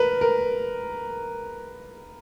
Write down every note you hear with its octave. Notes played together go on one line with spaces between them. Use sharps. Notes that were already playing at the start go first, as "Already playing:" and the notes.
Already playing: A#4 B4
A#4